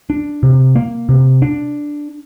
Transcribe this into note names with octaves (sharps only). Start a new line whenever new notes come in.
D4
C3
A#3
C3
D4